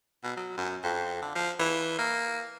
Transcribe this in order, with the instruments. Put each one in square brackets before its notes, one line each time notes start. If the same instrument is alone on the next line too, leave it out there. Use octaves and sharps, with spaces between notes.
[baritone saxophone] B2
F#3
F#2
F2
D3
F3
E3
A#3